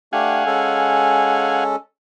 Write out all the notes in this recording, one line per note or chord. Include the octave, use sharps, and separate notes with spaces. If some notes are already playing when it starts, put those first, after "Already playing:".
A3 D4 G4 F5 F#5 G#5
G#3 C#4 A4